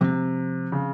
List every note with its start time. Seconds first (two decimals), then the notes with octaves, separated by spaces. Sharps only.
0.01 C3 F3 G#3 C4
0.72 C#3